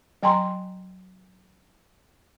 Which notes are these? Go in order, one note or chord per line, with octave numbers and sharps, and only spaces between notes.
F#3 G5 G#5 A#5 C6